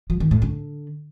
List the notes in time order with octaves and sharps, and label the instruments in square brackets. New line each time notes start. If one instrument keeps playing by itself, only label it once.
[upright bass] F3
D#3
A2
D3